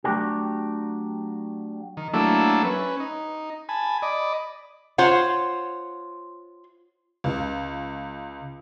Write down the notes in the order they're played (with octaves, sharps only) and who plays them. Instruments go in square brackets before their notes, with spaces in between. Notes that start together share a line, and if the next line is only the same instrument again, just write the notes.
[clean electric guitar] F#3 A3 A#3 D4 F#4 G4
[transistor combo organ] D#3
F#3 A3 A#3 D4 E4 A4
C#4 B4
D#4
G#5 A5 B5
D5 D#5 B5
[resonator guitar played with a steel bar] F4 C5 C#5 F#5
[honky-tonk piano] C#2